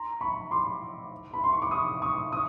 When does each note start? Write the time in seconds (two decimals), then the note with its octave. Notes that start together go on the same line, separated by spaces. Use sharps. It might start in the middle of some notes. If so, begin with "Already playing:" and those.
Already playing: A#5 C6
0.21 B5 C#6
0.51 C6 D6
1.34 B5
1.44 C6
1.53 C#6
1.62 D6
1.71 C#6 D#6
2.02 C#6 D#6
2.32 C#6 D#6